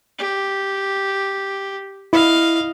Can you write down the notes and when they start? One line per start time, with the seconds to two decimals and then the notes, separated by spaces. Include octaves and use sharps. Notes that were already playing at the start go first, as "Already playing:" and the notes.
0.19 G4
2.13 E4 D#5 F5